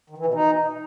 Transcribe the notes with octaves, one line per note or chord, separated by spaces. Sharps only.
D#3
E3
B2
D#4